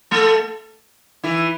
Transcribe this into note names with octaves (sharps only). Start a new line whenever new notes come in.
A3 A4
E3 E4